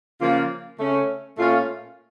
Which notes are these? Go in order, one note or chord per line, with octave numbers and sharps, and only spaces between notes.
C#3 F3 A#3 F4
C#3 A3 C#4
A#2 A3 C#4 F4